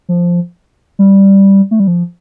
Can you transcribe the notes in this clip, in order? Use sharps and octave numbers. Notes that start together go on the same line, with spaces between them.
F3
G3
A3
G3
F3